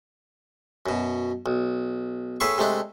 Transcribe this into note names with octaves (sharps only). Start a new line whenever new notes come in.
F#2 B2
B1
A2 G#4 B4 E5 C6 C#6
C3 G#3 A3 D4